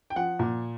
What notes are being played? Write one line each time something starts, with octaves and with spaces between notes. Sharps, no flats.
G5
F3 F#5
A#2